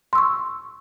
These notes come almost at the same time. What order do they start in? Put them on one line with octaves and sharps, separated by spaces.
C6 E6 C#6